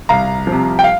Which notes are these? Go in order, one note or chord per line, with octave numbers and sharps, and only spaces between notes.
C2 F5 A#5
C3 F3
G5
F5